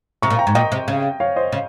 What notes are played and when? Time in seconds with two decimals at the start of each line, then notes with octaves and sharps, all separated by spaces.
0.22 C3 A#5 C#6
0.30 A#2
0.39 G5 A#5
0.47 G#2
0.55 A#2 D#5 G5
0.72 C3
0.88 C#3
1.20 C#5 F5
1.36 C5 D#5
1.52 C#3